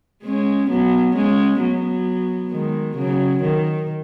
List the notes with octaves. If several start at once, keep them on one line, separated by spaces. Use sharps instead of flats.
G#3 C#4
F#3 B3
G#3 C#4
F#3 B3
D#3 G#3
C#3 F#3
D#3